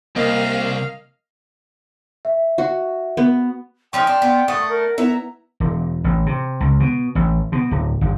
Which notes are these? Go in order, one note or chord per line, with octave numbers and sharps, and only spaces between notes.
C2 A#3 D#5 F5
E5
F#4
B3
F3 C#4 D#4 G5 C6 F6
D4
B3
A3 F#5 C#6 D#6
A#4
B3 E4 E5 A#5
E1
A1
C3
C#2
B2
A1
B2
D1
G1